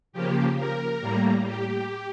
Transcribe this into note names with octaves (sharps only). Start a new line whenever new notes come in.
C#3 F3 A#3 G4
A#4
A2 G3 A#3
G4